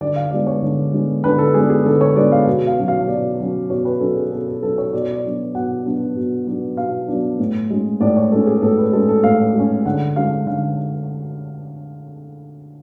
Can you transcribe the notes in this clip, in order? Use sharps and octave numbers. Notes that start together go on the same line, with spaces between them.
D3 D5
F5
G#3 B3 D4 D5
C#5
D3
G#3 B3 D4
D3 B4
A4
G#3 B3 D4 G#4
G#4
D3 A4
C#5
G#3 B3 D4 D5
F5
B2
F5
F#3 C#4
F5
B2 D5
F#3 C#4
B2 C#5
B4
F#3 C#4 A4
G#4
B2 A4
A4
F#3 C#4 A4
C#5
B2 D5
C#5
D5
F#3 B3 D4
B2 F#5
F#3 B3 D4
B2
F#3 B3 D4
B2 F5
F#3 B3 D4
A2
G#3 C#4
A2 D5
C#5
G#3 C#4 A4
G#4
A2 A4
B4
G#3 C#4 A4
A4
A2 F5
G#3
C#4
D3 F#5
G#3 C#4 F5
D3 F5